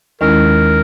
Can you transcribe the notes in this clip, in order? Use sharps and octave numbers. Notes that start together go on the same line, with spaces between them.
D#2 D#3 G#3 C#4 E4 A#4